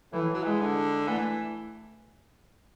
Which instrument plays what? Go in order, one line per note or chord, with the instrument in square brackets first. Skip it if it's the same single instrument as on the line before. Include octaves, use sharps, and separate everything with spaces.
[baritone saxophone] A2 [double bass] E3
[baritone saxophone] F#3
[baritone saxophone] E3 [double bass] G#3
[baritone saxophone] D3
[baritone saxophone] E3 [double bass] A3